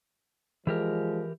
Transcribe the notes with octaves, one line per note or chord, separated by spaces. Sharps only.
E3 F3 G#3 G4 A#4